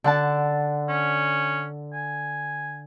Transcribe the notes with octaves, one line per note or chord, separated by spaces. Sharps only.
D3 F#5 A5
C#4
G#5